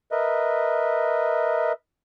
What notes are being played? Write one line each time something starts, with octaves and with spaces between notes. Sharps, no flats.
A#4 B4 D#5 E5